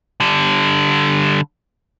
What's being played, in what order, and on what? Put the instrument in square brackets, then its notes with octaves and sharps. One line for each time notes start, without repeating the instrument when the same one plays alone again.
[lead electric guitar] D3 G3